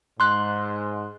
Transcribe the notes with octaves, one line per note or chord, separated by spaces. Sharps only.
G#2 C6 F#6